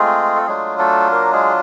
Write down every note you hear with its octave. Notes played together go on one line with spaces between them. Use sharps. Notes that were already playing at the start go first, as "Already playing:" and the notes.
Already playing: G#3 A3 C4 F4 G#4
A4
F#3 G#3 A3 D4 F4 G#4
A3 A4
A#3 A#4
G#3 G#4